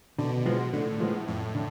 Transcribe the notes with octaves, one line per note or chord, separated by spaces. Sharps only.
B2 D3
F3 G#3 B3
A2 D3
F3 G#3 B3
F2 A2
D3